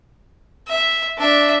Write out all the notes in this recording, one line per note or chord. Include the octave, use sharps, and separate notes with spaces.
E5
D4 E5